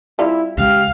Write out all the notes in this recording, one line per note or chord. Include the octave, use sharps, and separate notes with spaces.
G3 C4 E4 F4
C#2 C#3 G#3 G4 F5